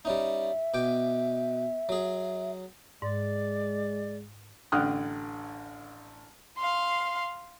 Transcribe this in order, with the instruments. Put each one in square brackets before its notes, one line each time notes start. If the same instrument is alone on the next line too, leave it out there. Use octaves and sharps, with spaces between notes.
[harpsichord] G3 C#4 D#4 [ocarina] E5
[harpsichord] B2 G5 D6
F#3 G#4
[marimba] G#2 [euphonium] G#3 [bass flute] D5
[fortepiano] A1 D3 G5 D#6 F6 F#6
[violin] F5 C6